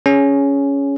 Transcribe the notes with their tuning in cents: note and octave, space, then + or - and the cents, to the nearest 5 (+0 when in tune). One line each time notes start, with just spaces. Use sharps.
C#4 +10 G#4 +0